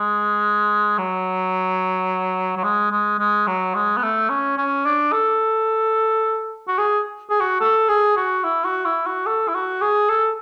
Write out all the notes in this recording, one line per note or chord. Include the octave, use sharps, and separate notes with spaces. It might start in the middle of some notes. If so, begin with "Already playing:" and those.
Already playing: G#3
F#3
F#3
G#3
G#3
G#3
F#3
G#3
B3
A3
C#4
C#4
D4
A4
F#4
G#4
G#4
F#4
A4
G#4
F#4
E4
F#4
E4
F#4
A4
E4
F#4
G#4
A4